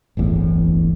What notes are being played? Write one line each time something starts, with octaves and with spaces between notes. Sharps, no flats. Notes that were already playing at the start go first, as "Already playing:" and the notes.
D1 G1 E2 A2